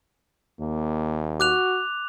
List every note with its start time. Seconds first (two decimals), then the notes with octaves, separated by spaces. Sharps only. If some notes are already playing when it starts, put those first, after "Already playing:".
0.60 D#2 A#3
1.40 F#4 D6 F#6 F7